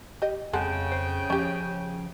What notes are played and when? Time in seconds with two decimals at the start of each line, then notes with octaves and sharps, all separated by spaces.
0.22 G4 D#5
0.53 F2 C#3 G#3 A4 F#5 G5
0.92 C5
1.30 F3 C#4 G4